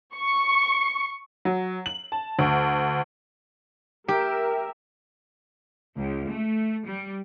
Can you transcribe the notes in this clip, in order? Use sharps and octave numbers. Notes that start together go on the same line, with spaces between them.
C#6
F#3
F#7
A5
D2
G4 A#4 E5
C#2
A3
G3